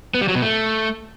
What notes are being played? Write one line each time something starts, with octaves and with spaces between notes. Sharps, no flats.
B3
G3
F#3
B2
A3